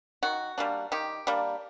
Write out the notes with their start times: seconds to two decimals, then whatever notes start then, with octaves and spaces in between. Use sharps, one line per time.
0.23 D#3 F#4
0.58 G3 A#3 D4
0.92 D#3 G4
1.27 G3 A#3 D4